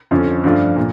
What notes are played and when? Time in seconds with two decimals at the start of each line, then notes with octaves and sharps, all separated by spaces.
0.11 F2 D3 F3 C#4
0.44 G2 F3 A3 D4 F4
0.76 A#2